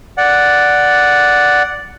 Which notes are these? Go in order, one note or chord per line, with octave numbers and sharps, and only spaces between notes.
D5 F#5